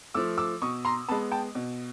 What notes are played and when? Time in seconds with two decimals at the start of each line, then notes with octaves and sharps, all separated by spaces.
0.14 F3 A3 D6 E6
0.38 D6 E6
0.62 B2 C#6 D#6
0.85 A#5 C6
1.09 G#3 B3 A5 B5
1.32 G5 A5
1.55 B2